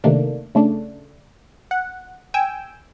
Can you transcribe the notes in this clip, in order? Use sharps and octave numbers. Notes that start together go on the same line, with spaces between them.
C3 D#3 A3 A#3 D4
C#3 A3 D4
F#5
G5 G#5 E6